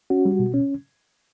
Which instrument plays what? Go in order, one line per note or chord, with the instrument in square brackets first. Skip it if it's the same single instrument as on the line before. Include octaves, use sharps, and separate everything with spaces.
[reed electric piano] C#4 F#4
G3
B2
C#4